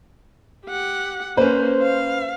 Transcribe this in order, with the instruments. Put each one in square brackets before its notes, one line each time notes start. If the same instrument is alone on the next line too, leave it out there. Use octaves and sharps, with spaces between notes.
[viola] G4 F#5
[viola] A#3 [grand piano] C#4 B4 [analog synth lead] C5
[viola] F5